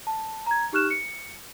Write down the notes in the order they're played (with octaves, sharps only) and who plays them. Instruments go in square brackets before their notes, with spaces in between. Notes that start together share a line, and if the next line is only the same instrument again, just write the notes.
[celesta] A5
A#5 G#6
D#4 G4 C#6 F6 F#6 E7
C#7